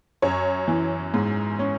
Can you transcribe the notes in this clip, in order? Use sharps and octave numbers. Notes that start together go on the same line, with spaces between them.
F#2 C#5
E3
G#2
C#4